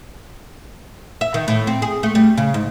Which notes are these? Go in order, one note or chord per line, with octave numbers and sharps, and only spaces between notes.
E5
D#3
A2
C4
G#4
A3
G3
C#3
G#2